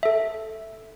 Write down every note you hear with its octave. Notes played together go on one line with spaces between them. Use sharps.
A4 E5